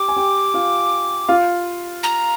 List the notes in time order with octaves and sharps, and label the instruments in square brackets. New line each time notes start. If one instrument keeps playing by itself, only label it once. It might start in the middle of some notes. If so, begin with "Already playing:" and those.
Already playing: [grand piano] G4 G5 [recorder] D6
[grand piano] G#5
G4 G5
F4 F5
F4 F5
[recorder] A#5